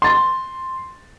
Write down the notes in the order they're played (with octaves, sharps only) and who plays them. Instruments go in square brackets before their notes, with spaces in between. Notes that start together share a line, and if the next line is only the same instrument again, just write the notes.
[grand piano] C6 A6